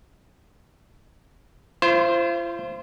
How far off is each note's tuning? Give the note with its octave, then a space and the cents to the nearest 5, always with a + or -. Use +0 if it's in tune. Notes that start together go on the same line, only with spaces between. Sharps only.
F4 -40 C5 +0